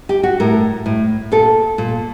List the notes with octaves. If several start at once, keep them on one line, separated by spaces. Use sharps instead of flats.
G4
F#4
A2 A#4
A2
A#2 A4
A#2